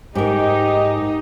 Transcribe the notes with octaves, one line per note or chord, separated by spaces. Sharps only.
G#2 D#4 G4 A#4